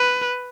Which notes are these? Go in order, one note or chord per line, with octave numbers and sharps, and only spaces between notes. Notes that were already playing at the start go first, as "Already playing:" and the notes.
Already playing: B4